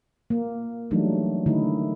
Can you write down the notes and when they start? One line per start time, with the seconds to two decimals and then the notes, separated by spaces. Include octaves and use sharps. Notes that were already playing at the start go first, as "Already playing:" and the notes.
0.30 A#3
0.91 E3 F#3 G3 A3 D4 D#4
1.46 D3 D#3 A3 D#4 E4